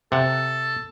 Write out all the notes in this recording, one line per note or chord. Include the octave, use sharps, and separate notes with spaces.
C3 A4 F#5